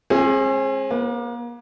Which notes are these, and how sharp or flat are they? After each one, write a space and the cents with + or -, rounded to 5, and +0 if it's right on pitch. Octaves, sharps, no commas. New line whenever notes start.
G#3 +5 C4 +45 G#4 +0
A#3 +35 B4 +0